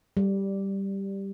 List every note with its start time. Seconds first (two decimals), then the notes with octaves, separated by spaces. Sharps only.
0.17 G3